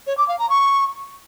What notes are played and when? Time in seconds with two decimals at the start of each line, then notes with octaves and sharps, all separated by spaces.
0.07 C#5
0.17 D6
0.28 F5
0.39 A#5
0.50 C#6